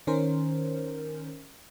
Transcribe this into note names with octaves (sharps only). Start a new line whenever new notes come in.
D#3 C#4 A#4 C5